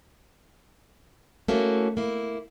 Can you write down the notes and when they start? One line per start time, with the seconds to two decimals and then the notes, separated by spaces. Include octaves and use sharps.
1.48 A3 A#3 C#4 E4 F#4 A4
1.97 A#3 E4